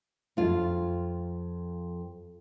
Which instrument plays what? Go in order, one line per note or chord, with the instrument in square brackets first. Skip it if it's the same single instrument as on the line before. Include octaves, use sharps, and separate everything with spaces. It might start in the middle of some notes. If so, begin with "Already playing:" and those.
[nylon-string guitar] F2 F4